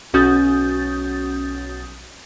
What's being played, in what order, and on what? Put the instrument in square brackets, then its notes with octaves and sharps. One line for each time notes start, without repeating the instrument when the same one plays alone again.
[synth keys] B1 C#4 F#4 D#6 G6 A6